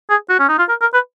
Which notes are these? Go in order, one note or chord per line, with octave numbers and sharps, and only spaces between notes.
G#4
F#4
C#4
D#4
F4
A#4
A#4
B4